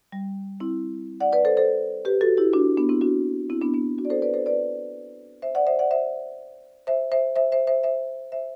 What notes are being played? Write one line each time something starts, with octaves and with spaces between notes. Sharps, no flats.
G3
C4 E4
D5 F#5
B4 D5
A4 C5
A4 C5
G4 B4
F#4 A4
E4 G4
D4 F#4
B3 D4
C4 E4
D4 F#4
C4 E4
B3 D4
B3 D4
D4 F#4
D5
A4 C5
B4 D5
A4 C5
B4 D5
C5 E5
D5 F#5
C5 E5
D5 F#5
C5 E5
C5 E5
C5 E5
C5 E5
C5 E5
C5 E5
C5 E5
C5 E5